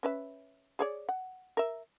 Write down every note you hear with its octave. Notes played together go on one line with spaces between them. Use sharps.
C#4 B4 E5
G#4 C#5 D5
F#5
A#4 E5